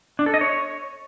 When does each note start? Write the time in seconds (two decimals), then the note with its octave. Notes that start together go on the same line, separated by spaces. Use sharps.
0.19 D4
0.26 A4
0.34 D#5
0.41 C#5